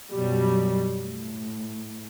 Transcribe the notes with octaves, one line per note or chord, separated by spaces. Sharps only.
F#2 B2 F#3 G3
A2